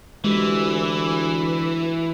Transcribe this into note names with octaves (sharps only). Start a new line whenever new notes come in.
D2 E3 G#3 G4